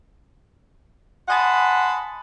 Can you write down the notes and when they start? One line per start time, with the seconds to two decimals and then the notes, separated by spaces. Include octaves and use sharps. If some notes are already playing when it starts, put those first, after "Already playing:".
1.29 D#5 F#5 G#5 A5 B5 C6